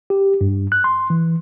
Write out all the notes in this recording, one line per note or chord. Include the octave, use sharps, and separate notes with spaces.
G4
G2
F#6
C6
E3